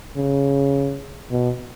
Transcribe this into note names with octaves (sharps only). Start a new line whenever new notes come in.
C#3
B2